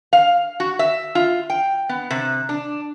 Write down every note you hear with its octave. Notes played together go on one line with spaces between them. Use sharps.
F5
F#4
E5
F4
G5
B3
C3
D4